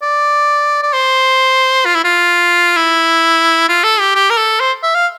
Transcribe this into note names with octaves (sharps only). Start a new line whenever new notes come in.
D5
D5
C5
F4
E4
F4
E4
F4
A4
G4
G4
A#4
A4
C5
E5
F5